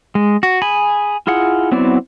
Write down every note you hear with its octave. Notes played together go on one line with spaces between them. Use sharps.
G#3
F#4
G#4 G#5 B5
E4 F4 G#4 F#5
F#3 B3 C4 E4 D5